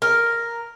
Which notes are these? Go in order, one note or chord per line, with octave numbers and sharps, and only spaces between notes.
A#4